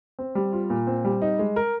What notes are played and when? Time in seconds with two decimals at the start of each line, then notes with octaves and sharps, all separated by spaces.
0.19 C4
0.35 G3
0.53 F4
0.70 A#2
0.87 C4
1.05 G3
1.22 D#4
1.39 G#3
1.56 A#4